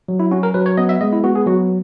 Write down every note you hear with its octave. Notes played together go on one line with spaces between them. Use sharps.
F#3
E4
C#4 F#4
A#4
F#3 B4
C#5
B3 D#5
E5
G#3 D#5
E4
B3 F#4
G#4
F#3 F#4